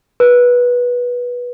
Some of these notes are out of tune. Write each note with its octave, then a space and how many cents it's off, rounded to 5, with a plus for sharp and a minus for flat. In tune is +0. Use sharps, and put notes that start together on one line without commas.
B4 -15